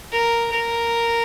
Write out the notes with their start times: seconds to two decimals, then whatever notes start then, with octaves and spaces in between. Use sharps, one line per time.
0.12 A#4
0.51 A#4